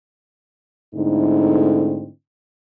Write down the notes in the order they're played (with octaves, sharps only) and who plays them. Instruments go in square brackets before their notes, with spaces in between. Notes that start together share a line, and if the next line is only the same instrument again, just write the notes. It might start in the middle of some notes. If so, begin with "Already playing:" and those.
[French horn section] G#2 D3 A3 C4 D#4 E4